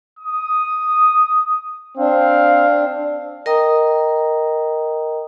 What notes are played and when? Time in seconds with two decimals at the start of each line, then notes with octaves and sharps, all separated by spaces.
0.19 D#6
1.98 C4 D4 F5
3.46 A#4 D#5 G5 A#5 D#6